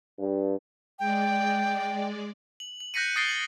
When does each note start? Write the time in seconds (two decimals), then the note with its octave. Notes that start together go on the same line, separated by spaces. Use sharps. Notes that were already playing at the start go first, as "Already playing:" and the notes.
0.17 G2
0.99 G#3 D5 G5
2.60 F#7
2.80 F#7
2.94 F#6 G6 A#6 B6 C#7 D#7
3.16 D#6 A6 A#6 C7 D7 G7
3.29 F#7 G7